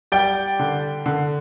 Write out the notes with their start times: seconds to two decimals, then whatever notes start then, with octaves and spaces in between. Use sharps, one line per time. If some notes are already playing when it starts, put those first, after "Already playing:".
0.12 G3 D5 G5
0.59 D3
1.06 D3